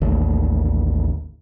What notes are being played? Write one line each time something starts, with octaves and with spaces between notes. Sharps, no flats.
A1 D#2 D3